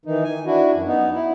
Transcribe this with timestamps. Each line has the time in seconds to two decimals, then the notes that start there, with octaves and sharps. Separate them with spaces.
0.05 D#3 E3 D#4
0.24 G#5
0.46 D4 E4 F#4
0.74 F#2
0.86 B3 D#4
1.14 E4